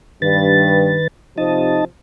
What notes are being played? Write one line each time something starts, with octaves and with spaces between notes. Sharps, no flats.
G2 D#3 B4 A6
C3 F3 D#4 D#5 A5